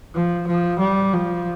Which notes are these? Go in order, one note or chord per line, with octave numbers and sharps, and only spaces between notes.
F3
F3
G3
F3